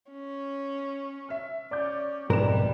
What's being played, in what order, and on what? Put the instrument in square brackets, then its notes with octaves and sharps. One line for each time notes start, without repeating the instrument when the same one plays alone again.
[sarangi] C#4
[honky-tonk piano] E5 F6
[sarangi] C#4 [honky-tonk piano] D5 D6 G6
[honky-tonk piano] F1 B4 E7 [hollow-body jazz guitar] B1 G#2 A#4 [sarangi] G3